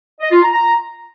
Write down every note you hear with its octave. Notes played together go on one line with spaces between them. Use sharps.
D#5
F4
A#5
A#5